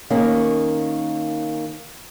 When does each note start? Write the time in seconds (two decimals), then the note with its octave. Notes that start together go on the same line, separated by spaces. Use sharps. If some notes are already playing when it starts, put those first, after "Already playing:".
0.10 D#3 A#3 C#4